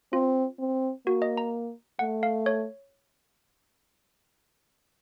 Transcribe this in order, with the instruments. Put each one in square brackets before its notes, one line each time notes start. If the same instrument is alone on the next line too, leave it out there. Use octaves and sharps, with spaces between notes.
[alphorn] C4 [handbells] F4
[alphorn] C4
[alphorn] A#3 [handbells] F#4
[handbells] D#5
A#5
[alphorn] A3 [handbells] F#5
[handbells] F5
C#5